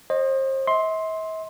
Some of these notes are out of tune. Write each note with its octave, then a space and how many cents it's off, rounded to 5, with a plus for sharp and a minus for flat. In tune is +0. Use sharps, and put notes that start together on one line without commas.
C5 +35 D#5 -15
E5 -45 C6 +10